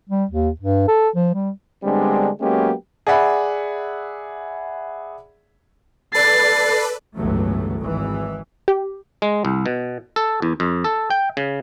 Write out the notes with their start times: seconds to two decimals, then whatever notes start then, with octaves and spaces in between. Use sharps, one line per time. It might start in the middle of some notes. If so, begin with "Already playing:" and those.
0.09 G3
0.31 D#2
0.60 G2
0.88 A4
1.15 F3
1.34 G3
1.84 D3 G3 G#3 B3 C4 D4
2.41 F#3 G#3 A#3 B3 C#4 G4
3.07 G#4 D5 E5 F#5 B5
6.14 A4 B4 D5 A6 C7
7.15 G1 C#2 A2 E3 F#3 A3
7.79 G#1 E3
8.68 G4
9.22 G#3
9.45 C2
9.66 B2
10.16 A4
10.42 E2
10.60 F2
10.84 A4
11.10 G5
11.37 C#3